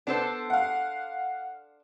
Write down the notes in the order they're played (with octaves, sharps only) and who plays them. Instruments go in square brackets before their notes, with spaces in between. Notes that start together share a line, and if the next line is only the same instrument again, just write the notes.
[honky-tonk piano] B3 [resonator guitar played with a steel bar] D4 A4 C5
[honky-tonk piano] F5 F#5